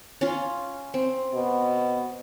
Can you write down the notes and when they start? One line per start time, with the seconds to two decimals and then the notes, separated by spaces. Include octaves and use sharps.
0.21 C#4 F4
0.94 C4
1.34 B2